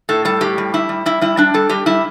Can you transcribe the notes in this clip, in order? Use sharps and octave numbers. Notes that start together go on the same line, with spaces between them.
A2 A4
G3 A4
A2 G4
G3
G3 E4
G3
G3 E4
G3 E4
G3 D4
G3 A4
G3 G4
G3 E4